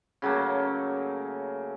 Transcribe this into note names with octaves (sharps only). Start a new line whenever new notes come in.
C#3 F#3 A3 A#3